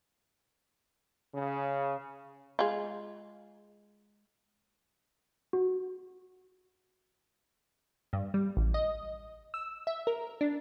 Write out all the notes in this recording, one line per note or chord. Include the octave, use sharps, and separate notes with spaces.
C#3
G#3 F4
F#4
G2
G3
A1
D#5
E6
E5
A#4
D4